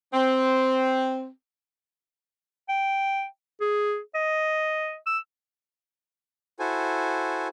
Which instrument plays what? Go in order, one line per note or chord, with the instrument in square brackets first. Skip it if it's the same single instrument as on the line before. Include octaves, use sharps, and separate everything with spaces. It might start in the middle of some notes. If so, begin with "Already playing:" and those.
[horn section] C4
[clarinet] G5
G#4
D#5
E6
[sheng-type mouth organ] E4 F#4 A4 C5 G#5